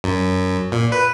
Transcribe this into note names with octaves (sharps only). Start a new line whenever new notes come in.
F#2
A#2
B4